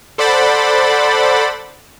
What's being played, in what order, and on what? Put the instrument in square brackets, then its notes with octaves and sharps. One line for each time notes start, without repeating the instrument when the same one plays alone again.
[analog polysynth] A4 C5 D5 F#5 B5 A6